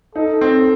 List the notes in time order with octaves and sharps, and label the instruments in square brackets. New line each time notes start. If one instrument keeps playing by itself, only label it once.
[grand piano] D#4 [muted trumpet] A4
[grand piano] C4